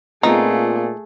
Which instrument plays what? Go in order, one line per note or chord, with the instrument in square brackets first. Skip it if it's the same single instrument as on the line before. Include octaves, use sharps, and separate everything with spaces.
[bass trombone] A#2 [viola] A3 G#4 [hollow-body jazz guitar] B3 C4 F4 [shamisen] D#4